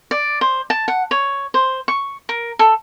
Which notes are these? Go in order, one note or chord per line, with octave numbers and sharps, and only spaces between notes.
D5
C5
A5
F#5
C#5
C5
C#6
A#4
A4